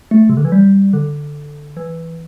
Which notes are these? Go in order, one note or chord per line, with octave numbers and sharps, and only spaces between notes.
A3
C3
D3
E3
G3
D3
E3